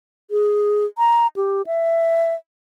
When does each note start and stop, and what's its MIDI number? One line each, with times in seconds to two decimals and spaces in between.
0.31 0.85 68
0.98 1.27 82
1.36 1.62 67
1.67 2.34 76